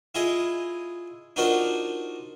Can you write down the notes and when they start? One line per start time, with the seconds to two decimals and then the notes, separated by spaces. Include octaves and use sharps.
0.15 E4 F4 G#4 D#5
1.36 D4 D#4 F4 F#4 A#4 C5